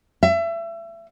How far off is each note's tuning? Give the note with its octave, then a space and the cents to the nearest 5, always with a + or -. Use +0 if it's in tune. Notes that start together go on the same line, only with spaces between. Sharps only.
E5 +30